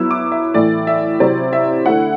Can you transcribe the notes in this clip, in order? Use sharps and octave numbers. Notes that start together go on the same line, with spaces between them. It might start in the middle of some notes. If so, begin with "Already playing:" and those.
Already playing: F#3 B3 E4 E6
D6
E5
A2 E3 A3 E4 D5
E5
C3 F#3 C4 E4 D5
E5
D3 A3 E4 F#5